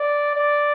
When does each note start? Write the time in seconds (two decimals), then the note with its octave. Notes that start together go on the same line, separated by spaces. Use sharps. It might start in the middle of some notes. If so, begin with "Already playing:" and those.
Already playing: D5
0.35 D5